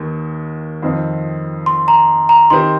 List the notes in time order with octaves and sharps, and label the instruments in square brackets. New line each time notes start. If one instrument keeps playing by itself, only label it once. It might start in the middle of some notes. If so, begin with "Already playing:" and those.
Already playing: [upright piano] D#2 D#3
F2 D#3 C4
[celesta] C6
A#5
A#5
[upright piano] D#3 C4 G4 C5 [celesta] C6